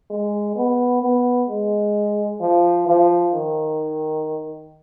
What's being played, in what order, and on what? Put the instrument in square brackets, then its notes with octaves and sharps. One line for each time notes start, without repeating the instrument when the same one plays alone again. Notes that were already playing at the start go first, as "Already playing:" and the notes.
[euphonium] G#3
B3
B3
G#3
F3
F3
D#3